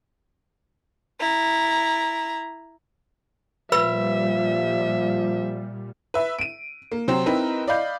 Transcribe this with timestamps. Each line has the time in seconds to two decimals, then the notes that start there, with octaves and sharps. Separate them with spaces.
1.21 E4 A#5
3.72 A#2 F3 G3 B4 E5 B5 E6
6.14 B4 E5
6.39 D7 D#7
6.92 A#3
7.08 C3 F#3 C4 C5 E7
7.26 C4 D#4 E4 A#4 B4
7.68 D5 D#5 F5 B5 G6